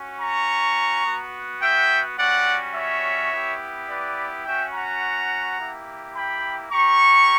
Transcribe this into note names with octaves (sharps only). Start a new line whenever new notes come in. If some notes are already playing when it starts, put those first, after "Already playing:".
Already playing: C#4 F#4
A#5 C#6
B3 F#4
E5 G5
G3 C#4 F#4 D5 F#5
C#5 E5
B3 E4 G4
B4 D5
C#4 F#4 E5 G5
F#5 A#5
A#3 E4 G4
G5 B5
C#4 G4 A#5 C#6